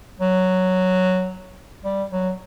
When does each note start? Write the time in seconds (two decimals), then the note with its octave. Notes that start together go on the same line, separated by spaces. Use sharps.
0.20 F#3
1.85 G3
2.11 F#3